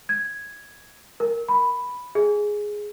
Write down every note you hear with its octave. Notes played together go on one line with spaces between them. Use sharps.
G#6
A#4
B5
G#4